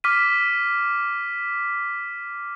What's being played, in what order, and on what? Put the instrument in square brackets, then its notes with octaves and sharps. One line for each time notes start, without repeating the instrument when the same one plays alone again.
[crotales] D6 F6 B6 D#7